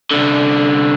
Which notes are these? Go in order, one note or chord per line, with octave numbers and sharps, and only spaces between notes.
C2 D3